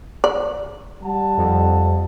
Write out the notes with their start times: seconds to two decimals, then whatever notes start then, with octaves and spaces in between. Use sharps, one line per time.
0.24 D5
1.03 G3 F#5 A5
1.37 F2